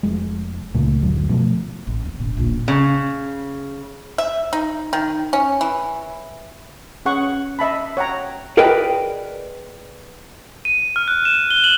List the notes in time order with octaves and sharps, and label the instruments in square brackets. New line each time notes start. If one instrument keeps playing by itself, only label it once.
[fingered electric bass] F1 G#3
C#2 A#2 C#3 A3
F#1 D2 F#3
B2 F3 A3
[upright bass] A1
E2
E1 A1
D#1 A#1
[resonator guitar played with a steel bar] C#3
[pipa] E5
D#4
D#3
C#4
E3
[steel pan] C#4 G#4 F#5 C#6
D#5 E5 A5 B5
C#5 F#5 G5 A#5
[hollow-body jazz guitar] G#4 A#4 B4 D5 D#5 G5
[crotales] D#7
F6
F#6
E7
G7
F#7